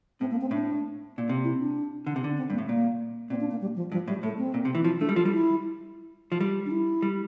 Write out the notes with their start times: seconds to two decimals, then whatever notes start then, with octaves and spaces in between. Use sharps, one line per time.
0.20 A2 C4
0.31 A#3
0.41 C4
0.51 A2 D4
1.18 A#2
1.29 C3
1.44 E4
1.60 D4
2.07 D3
2.16 C3
2.24 D3
2.37 C4
2.50 G2 A#3
2.58 A2
2.68 A#2 A#3
3.30 A#2 C4
3.40 D4
3.51 A#3
3.61 G3
3.76 F3
3.92 G2 F3
4.07 A2 G3
4.23 A2 A3
4.38 C4
4.54 A#2
4.65 C3
4.75 E3
4.84 F3 E4
5.00 A3 D4
5.09 G3
5.16 F3 F4
5.25 G3
5.32 E4
6.32 F3
6.40 G3
6.66 D4
6.71 E4
7.02 G3